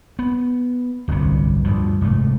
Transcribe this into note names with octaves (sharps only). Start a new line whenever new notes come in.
B3
D1 G1 C2 C3
D2 G2 F3
F1 G#2 A3